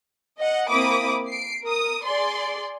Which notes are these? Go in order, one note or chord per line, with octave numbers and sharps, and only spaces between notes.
D#5 F#5
A#3 C4 E4 B5 D6 D#6
C7 D7
A#4 D#6
G#4 D5 C6